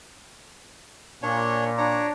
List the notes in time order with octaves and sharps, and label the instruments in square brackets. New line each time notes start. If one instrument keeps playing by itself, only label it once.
[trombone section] A#2 [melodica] D4 C#5
[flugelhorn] D4 [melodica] C#5 A#5